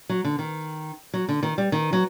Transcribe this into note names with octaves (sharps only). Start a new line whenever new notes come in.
F#3
D3
D#3
F#3
D3
D#3
G3
D#3
F#3